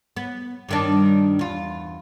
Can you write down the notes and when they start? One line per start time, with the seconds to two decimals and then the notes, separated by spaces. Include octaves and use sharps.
0.17 B3
0.69 G2 D#3 D4
1.39 E2 F4